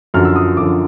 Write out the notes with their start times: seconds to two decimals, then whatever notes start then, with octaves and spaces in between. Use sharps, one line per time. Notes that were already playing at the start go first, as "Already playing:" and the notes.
0.14 F#2 D3 F3 F6
0.25 E6
0.36 D#6
0.57 F#2 D3 F3 D6